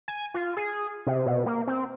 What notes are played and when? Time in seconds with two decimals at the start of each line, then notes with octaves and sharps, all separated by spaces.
0.08 G#5
0.34 F4
0.57 G#4
1.07 C3
1.26 B2
1.46 A#3
1.67 C4